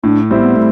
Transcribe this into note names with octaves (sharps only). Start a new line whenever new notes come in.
A2 D4
G3 C4 E4
B3
A2 A3